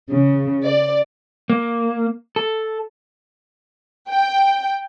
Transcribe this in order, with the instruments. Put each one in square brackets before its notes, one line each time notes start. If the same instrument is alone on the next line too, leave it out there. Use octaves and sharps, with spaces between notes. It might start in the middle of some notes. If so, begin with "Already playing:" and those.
[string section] C#3
D5
[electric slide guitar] A#3
A4
[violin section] G5